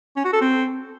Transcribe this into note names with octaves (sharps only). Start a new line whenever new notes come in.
C#4
F#4
A4
C4